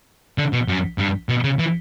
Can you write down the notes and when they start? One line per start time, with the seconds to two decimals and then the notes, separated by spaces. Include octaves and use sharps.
0.38 D3
0.53 B2
0.68 F#2
0.98 G2
1.29 B2
1.44 C#3
1.59 E3